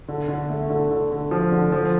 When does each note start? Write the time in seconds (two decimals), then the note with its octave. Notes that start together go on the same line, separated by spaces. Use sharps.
0.08 D3
0.28 D3
0.49 A3
0.70 D3
0.91 D3
1.11 D3
1.31 F3
1.52 D3
1.72 F3